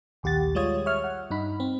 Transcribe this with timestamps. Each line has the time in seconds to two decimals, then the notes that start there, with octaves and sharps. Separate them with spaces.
0.23 A#1 D#2 G4 F#5 A6
0.55 G3 G#3 F4 C#5 D#6 G#6
0.86 C#5 E5 C#6 F6
1.04 F#5
1.31 G2 D#4 B5
1.60 C4